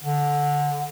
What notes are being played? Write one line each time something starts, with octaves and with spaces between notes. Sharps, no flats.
D3